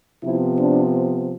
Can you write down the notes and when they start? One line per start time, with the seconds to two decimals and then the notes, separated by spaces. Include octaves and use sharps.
0.23 C3 F3 B3 E4
0.59 D4